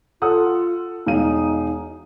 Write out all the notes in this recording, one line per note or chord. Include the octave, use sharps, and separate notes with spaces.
F4 A4 F#5 D#6
E1 D#4 F5 D#7